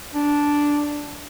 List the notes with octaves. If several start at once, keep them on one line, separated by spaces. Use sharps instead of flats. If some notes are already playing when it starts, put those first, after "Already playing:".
D4